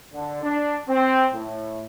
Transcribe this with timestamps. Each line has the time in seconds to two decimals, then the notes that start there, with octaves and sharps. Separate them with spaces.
0.13 D3
0.43 D4
0.89 C4
1.33 A2